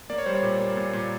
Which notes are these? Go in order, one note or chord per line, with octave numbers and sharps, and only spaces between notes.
A#3 D5
C#5
G3 C5
C#5
A#2
A#3
A#2
A#2